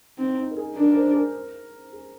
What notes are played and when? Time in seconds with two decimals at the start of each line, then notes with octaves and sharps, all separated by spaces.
0.18 C4 D#4
0.37 D#4
0.51 A#4
0.57 G#4
0.76 D4 A#4
0.91 A#4
0.96 C5
1.11 G#4
1.14 A#4
1.93 G#4